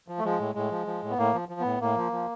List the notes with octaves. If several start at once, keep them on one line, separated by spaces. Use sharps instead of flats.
F3
A3
F3 G#3
A2
A2 G#3
F3
F3
A2
B3
A2 A#3
F3
F3
A2 B3
A2 A#3
F3
F3